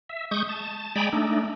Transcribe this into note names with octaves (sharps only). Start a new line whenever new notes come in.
E5
G#3 C#6 D#6 G6
A5
G#3 D5 G5 G#5 A#5 B5
A3 D4 D#4